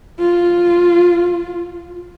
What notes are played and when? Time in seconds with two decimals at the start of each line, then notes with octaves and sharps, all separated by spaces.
0.19 F4